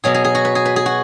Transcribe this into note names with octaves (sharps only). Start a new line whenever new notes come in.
B2 F#3 G#4
G#4
G#4
F#4
B4
G#4
B4
G#4
F#4